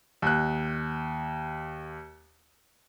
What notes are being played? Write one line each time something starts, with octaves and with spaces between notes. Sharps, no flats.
D#2 F#6